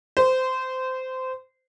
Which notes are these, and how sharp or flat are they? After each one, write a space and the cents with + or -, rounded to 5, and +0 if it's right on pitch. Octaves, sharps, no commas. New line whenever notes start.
C5 -20